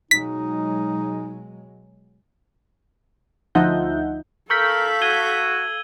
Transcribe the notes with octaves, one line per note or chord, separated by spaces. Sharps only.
B2 F#3 G#3 D#4 B6
D2 F3 D#4 E5 F#5 G6
A4 A#4 F5 C#6 E6 G6 B6
F#4 G#6 D#7 G7